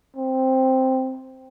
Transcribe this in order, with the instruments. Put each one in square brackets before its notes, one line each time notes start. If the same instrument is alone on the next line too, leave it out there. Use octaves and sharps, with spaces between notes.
[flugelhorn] C4